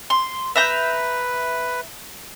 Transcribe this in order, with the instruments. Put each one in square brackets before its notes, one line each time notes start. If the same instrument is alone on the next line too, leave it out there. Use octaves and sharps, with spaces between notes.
[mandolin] C6
[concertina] B4 [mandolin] E5 A#5 G6